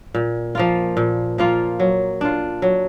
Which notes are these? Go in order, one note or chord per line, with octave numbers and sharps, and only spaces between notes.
A#2
F3 A#3 F4
A#2
F3 A#3 F4
F#3
D4 F4
F#3